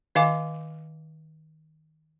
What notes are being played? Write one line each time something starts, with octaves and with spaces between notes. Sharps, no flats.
D#3 D#5 F5 G#5 D6